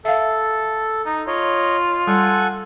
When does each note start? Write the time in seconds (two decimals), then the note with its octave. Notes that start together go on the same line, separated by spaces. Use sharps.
0.05 A4 E5 F5
1.06 D#4
1.27 F4 C#5 D#5
2.07 G3 A4 F#5 G#5